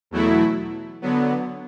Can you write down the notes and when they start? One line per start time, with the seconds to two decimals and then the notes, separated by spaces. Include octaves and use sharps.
0.11 E2 B2 F#3 A3 E4
1.02 D3 F#3 B3